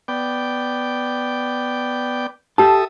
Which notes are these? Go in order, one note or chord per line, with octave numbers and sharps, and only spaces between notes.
B3 D5 G5
G4 A4 E5 A5 D#6